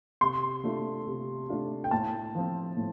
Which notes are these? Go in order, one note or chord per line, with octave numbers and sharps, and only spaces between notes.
C3 C6
A3 D4 F4
C3
A3 D4 F4
G5
A2 A5
F3 C4
A2